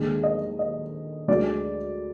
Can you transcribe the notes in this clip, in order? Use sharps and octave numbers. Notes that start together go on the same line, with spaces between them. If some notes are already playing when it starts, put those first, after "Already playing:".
Already playing: D#2 D3 G#3
D#5
D#5
D2 D3 G#3 D5